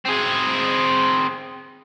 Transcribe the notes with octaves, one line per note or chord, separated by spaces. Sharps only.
C4 G#4